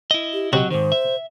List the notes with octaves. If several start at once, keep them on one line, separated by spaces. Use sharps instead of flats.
E4 D#5
G4
C3 F#3 F#4 D#5
G#2 D#3 C5
E5